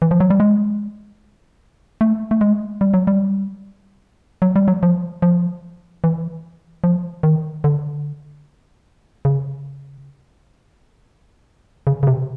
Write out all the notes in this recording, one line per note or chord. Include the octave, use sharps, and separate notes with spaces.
E3
F3
F#3
G3
G#3
A3
A3
G#3
G3
F#3
G3
F#3
G3
F#3
F3
F3
E3
F3
D#3
D3
C#3
C#3
C#3
C3